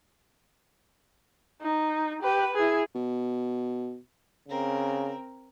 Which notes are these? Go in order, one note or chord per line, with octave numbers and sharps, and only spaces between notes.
D#4
G4 B4
E4 G#4
B2
C#3 C4 A#4